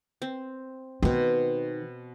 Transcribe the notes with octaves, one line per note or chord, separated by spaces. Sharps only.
C4
B2 D#3 C4